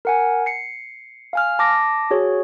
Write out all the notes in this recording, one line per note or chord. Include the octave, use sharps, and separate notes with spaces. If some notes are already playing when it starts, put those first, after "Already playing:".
A#4 F#5 G#5
C7 C#7
F5 G#5 F6
A5 D6 A#6
F#4 G#4 C#5